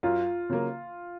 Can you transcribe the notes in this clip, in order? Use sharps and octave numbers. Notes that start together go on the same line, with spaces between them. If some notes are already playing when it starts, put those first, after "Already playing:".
F#2 F4
C#3 F#3 A#3